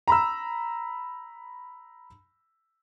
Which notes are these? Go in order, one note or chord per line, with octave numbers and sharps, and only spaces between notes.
A#5 B5 E6